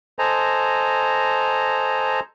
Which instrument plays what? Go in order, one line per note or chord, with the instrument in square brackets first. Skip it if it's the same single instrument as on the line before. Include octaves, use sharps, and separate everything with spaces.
[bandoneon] A4 C5 D#5 G#5 A#5